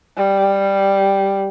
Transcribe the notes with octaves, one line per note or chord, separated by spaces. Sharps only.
G3